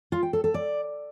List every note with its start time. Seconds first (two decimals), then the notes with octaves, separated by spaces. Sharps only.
0.12 F4
0.23 G5
0.33 A4
0.44 A4
0.54 D5